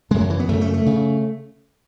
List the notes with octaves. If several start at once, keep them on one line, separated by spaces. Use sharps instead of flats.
F#2 C#3 G#3
F#3
E3
B3
F#2 C#3 A3
A3
A3
C#3